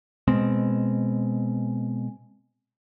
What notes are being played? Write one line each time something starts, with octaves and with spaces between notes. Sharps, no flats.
B2 G#3 C4